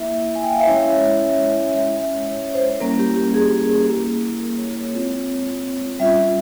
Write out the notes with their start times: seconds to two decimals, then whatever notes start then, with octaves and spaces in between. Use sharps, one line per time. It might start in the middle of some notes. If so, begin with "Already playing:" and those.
Already playing: A#3 E4 E5
0.36 G#5
0.43 G5
0.51 F5
0.60 E5
0.67 G#3 C#4 E4 C#5
1.74 G#3 C#4 E4 E5
1.93 C#5
2.00 E5
2.28 C#5
2.54 C5
2.80 G3 A#3 C#4 E4 A#4
2.99 G4
3.16 G4
3.34 G#4
3.87 A#3 E4
4.40 A#4
4.58 C#5
4.76 C#5
4.93 G#3 C4 F4
5.99 G3 C#4 F4 E5